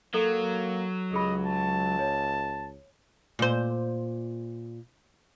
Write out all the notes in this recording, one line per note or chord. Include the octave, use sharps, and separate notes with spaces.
F#3 A#3 A4
C#2 G4 G#4 D#5 B5
A5
C#5
A#2 C5